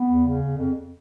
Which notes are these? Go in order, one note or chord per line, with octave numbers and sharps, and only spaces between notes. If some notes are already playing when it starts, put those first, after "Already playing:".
Already playing: B3
E2
C#3
E2
F2